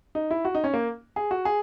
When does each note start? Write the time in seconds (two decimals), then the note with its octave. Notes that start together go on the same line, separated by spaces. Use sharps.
0.15 D#4
0.31 E4
0.45 F#4
0.55 D#4
0.64 C#4
0.73 A#3
1.16 G#4
1.31 F#4
1.45 G#4